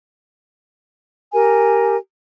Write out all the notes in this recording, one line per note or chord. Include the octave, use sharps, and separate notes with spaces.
G4 A#4 G#5